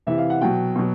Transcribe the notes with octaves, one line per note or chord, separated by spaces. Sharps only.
C3 E3 E5
F5
F#5
B2 F#3 G5
B2 F#3